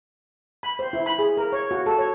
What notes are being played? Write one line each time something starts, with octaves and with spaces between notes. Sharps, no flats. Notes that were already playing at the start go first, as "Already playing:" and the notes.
B5
C5
E4
B5
G#4
A#4
C#5
F#4
A4
C#5